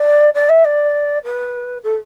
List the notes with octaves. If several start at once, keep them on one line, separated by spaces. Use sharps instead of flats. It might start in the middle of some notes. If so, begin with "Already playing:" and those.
Already playing: D5
D5
E5
D5
B4
A4